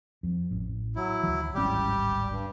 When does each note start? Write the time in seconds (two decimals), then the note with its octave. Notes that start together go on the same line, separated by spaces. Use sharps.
0.23 F2
0.51 A1
0.96 F#3 E4
1.23 D2 E3
1.54 D1 G#1 G3 C#4 G4
2.30 G2